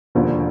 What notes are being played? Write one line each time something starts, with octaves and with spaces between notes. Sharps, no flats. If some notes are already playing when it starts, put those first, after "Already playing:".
E1 D#2 D3 F3